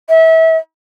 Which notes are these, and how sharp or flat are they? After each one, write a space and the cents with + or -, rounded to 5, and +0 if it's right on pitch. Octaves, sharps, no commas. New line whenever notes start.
E5 -30